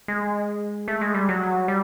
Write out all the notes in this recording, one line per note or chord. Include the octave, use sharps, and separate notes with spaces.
G#3
A3
G#3
G3
F#3
G3